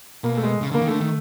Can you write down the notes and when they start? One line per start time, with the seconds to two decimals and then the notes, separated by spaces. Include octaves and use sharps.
0.24 B2 A#3
0.37 A3
0.43 G#3
0.62 C#3
0.71 D3
0.74 A#3
0.81 D#3
0.88 D3 A3
1.01 D#3